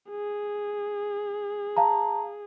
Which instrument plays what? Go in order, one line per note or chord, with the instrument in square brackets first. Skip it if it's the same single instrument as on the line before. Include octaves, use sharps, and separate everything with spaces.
[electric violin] G#4
[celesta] F5 A5 A#5